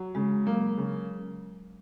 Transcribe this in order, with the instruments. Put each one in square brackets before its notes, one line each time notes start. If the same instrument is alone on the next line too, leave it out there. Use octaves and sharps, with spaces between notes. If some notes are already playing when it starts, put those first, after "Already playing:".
Already playing: [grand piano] F#3
[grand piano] C#3 [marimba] G#3
[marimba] F#3 [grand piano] A#3
[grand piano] C#3